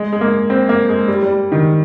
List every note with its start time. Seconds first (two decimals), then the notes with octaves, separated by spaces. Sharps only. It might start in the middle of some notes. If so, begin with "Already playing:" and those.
Already playing: G#3
0.13 G#3
0.21 A#3
0.50 C4
0.69 A#3
0.89 G#3
1.08 G3
1.23 G3
1.52 D#3